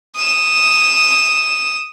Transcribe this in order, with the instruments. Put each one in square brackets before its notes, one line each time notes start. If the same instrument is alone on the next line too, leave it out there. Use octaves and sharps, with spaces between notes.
[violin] D#6 E7